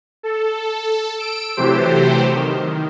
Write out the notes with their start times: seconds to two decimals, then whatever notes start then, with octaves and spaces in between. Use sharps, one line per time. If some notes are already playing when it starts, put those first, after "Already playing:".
0.23 A4
1.19 E6 D7
1.57 C3 E3 F#3 A3 G4 C5
2.34 D#3